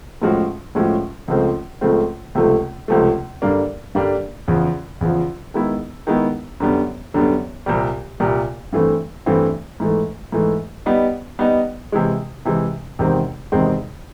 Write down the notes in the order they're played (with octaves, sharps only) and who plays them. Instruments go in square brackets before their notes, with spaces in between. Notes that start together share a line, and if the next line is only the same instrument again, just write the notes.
[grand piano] A2 F3 G#3 C#4 F#4
A2 F3 G#3 C#4 F#4
C#2 C#3 F3 A3 C4
C#2 C#3 F3 A3 C4
C#2 C3 F3 A3
C#2 C3 F3 A3
G2 D3 G3 A#3 D4
G2 D3 G3 A#3 D4
E2 C#3 F3
E2 C#3 F3
D#3 G#3 B3 E4
D#3 G#3 B3 E4
F#2 D3 G3 B3
F#2 D3 G3 B3
C2 A#2 G3
C2 A#2 G3
G2 E3 A3 C4
G2 E3 A3 C4
G#2 E3 A3
G#2 E3 A3
G3 B3 D#4
G3 B3 D#4
C3 E3 G#3
C3 E3 G#3
E2 C3 D#3 G#3 C4
E2 C3 D#3 G#3 C4